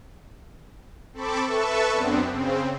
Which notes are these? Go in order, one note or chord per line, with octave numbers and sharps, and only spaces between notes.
C4 A4 A5 B5 C#6 D6
A4 B4 E5 A5 C#6
F#2 B3 C4 D4
C#3 C4